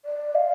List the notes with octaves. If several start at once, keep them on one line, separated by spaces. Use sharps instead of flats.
D5
F5